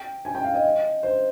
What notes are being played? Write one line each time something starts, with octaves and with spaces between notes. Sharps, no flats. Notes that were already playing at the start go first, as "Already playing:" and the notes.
Already playing: G5
G#5
G5
F5
D#5
C5